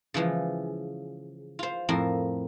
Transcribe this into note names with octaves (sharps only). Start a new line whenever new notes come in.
C#3 E3 F3 G#3
F4 C5
F2 A2 C4 A#4